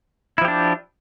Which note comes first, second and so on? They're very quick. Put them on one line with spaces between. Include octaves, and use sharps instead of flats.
E4 F3 G4 D4